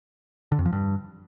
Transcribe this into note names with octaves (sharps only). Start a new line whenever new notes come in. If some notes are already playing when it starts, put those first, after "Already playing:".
D3
F2
F3
G2